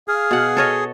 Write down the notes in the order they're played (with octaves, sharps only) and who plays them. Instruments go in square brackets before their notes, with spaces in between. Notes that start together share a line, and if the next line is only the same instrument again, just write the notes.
[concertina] G#4 [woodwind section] F5 F6
[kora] B2 F#5
A4 C#5 D#5